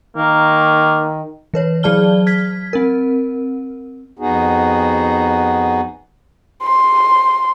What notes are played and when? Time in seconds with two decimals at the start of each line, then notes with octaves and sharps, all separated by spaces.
0.17 D#3 A#3
1.54 E3 B4 C#5
1.83 F#3 G#4 D5 A5 F6 G7
2.26 F6 G#6 B6
2.73 C4 A#4
4.19 F2 B3 D#4 F#4 G#4
6.64 C6